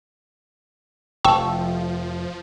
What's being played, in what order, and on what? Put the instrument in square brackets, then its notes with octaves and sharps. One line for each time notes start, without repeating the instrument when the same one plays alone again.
[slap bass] F1 [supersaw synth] F3 [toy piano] G5 [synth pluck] A5 C#6 E6